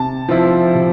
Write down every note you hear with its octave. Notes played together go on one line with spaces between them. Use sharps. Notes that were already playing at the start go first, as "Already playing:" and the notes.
Already playing: C3 A5
F3 C4 E4
C3